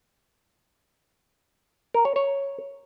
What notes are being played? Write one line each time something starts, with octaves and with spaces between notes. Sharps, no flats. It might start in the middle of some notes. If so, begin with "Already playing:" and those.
A#4
C#5
C#5